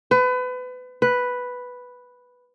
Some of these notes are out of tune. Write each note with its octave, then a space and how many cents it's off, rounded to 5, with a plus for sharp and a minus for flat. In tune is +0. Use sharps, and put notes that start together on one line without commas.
B4 +30
B4 +0